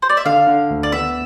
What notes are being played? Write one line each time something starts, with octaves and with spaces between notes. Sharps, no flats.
C5
D5
E5
D3 F5
D3
D2
D5
B3 E5